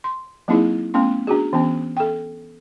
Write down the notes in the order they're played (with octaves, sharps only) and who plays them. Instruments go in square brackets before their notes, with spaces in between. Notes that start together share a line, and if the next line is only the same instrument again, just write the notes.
[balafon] C6
F#3 A#3 C4 D#4 E4 G#4
A3 B3 C#4 C6
D4 F#4 G#4
E3 B3 C#4
A4 G5